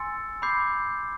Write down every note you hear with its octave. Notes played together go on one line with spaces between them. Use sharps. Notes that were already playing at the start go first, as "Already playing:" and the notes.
Already playing: G#5 C6 E6 A6 C#7
B5 D6 G6 C7